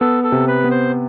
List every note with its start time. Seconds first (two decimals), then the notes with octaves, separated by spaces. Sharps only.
0.01 B3 A4
0.24 A4
0.32 C3
0.48 B4
0.64 B3
0.71 C5